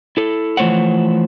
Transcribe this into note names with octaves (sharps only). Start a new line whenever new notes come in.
E4 A4
E3 F3 A3 C5 C#5 F#5